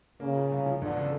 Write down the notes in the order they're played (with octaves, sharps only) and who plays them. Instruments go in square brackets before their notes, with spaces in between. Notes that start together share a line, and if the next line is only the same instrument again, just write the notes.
[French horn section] C#3 [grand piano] A#3
[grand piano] A#2
C2
F3
[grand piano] E2 [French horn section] D3
[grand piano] C#3